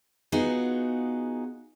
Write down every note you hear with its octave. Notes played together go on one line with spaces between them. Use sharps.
B3 D#4 F4 F#4 G#4